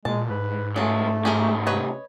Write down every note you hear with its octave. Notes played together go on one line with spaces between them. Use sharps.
A#2 G#3 A5
G#2 B4
C#3 F#3 G#3 A3 A4
A2 C#3 G4 G#4 A#4
C3 B4 C#5 D#5